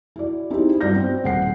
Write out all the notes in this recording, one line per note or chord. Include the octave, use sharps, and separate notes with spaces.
E4 F#4 D5
C4 D#4 E4 G4
G2 F#4 D5 G6 A#6
C4
D#1 F#5 C7